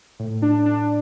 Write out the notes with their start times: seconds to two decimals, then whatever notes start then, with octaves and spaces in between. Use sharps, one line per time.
0.19 A2
0.42 D4
0.66 D4